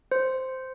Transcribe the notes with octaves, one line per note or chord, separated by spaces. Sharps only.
C5